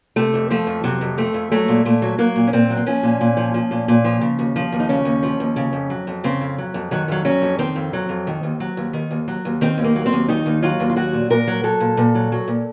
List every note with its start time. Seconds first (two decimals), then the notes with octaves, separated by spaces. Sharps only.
0.16 C3 A3
0.34 F2
0.50 F3 A3
0.67 F2
0.84 C3 F#3
1.01 F2
1.18 F3 A3
1.34 F2
1.52 F#3 A3
1.68 A#2
1.85 A#2 A3
2.02 F#3
2.18 F#3 A#3
2.36 A#2
2.47 C#4
2.53 A#2 C4
2.70 F#3
2.77 C4
2.86 F3 C#4
3.03 A#2
3.21 A#2
3.37 F3
3.54 F3
3.71 A#2
3.88 A#2
4.04 F3
4.21 C#3
4.39 D#2
4.56 F3
4.72 D#2
4.80 D#4
4.89 C#3 C#4
5.05 D#2
5.23 F3
5.40 D#2
5.56 C#3
5.73 F2
5.90 F#3
6.07 F2
6.24 C#3 C4
6.41 F2
6.58 F#3
6.74 F2
6.91 D#3 F#3
7.08 F2 F#3
7.25 F#3 C#4
7.41 F2
7.59 D#3 C4
7.76 F2
7.93 F#3
8.09 F2
8.27 D#3
8.43 D#2
8.60 F#3
8.77 D#2
8.93 D#3
9.11 D#2
9.28 F#3
9.45 D#2
9.61 D#3 C4
9.78 D#2
9.84 A#3
9.96 F#3
10.06 C4
10.13 D#2
10.28 D#3 D#4
10.46 D#2
10.62 F#3 F4
10.80 D#2
10.90 F4
10.96 F#3 F#4
11.13 A#2
11.30 A#2 A#4
11.47 F#3
11.64 F#3 A4
11.80 A#2
11.97 A#2
12.15 F#3
12.32 F#3
12.48 A#2